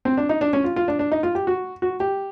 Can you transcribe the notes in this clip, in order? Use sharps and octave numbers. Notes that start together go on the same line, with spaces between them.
C4
D4
D#4
D4
C#4
F4
F4
D4
D4
D#4
F4
G4
F#4
F#4
G4